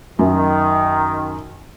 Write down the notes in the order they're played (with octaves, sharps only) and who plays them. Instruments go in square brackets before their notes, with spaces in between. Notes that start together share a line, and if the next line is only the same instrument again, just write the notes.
[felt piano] F#2 [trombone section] D#3